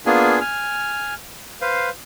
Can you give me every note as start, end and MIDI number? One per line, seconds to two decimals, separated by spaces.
0.06 0.39 58
0.06 0.39 59
0.06 0.39 62
0.06 0.39 65
0.06 0.39 68
0.06 0.39 80
0.41 1.14 80
0.41 1.14 89
1.61 1.90 71
1.61 1.90 72
1.61 1.90 77